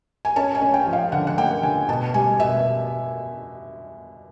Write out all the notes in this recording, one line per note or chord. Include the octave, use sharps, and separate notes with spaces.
G#5
C#4 A5
G#5
C#4
G5
F3
F5
D3 F#5
F#5
A#3 G5
D3 G#5
B2 A5
G3 G#5
B2 E5